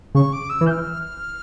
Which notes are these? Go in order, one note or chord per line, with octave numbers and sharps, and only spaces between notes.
C#3 C#6
D6
E6
E3
G6
F6